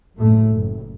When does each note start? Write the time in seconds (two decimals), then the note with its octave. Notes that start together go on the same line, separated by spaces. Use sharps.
0.17 F#1 F#2 A2 A3
0.52 F#1 F#2